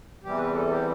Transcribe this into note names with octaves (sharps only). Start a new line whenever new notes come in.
E2 C3 E3 G3 G4
B4
A4
G4